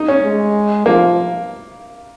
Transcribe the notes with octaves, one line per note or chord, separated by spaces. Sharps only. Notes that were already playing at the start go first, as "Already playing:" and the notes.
Already playing: D#4
C#4
G#3
F3 A#3